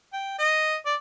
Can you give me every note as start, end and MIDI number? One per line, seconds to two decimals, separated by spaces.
0.13 0.37 79
0.39 0.75 75
0.86 0.95 74